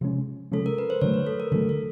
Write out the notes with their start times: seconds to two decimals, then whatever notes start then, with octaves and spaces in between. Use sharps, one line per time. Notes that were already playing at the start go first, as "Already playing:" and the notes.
0.01 C3 F3 G#3 C#4
0.51 C3 F3 G#3 C#4 A4
0.66 A#4
0.78 B4
0.90 C5
1.01 D3 F#3 A3 C#5
1.14 B4
1.27 A4
1.40 A#4
1.52 D3 F#3 A3 A4
1.69 A4